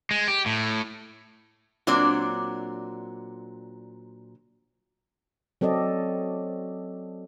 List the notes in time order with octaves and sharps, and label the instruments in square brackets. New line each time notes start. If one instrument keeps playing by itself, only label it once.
[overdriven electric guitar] G#3
G4
A2
[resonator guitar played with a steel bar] A#2 F#3 C4 D4 D5
[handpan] F#3 C4 A4 D5 D#5